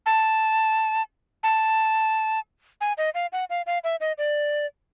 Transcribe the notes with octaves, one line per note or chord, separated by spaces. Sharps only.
A5
A5
G#5
D#5
F5
F#5
F5
F5
E5
D#5
D5